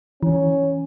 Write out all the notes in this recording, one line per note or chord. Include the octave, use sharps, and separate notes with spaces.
E3 C#4